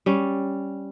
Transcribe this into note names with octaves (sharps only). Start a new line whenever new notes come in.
G3 C#4